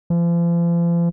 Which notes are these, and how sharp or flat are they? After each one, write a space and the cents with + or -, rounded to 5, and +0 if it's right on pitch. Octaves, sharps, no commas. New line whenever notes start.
F3 -40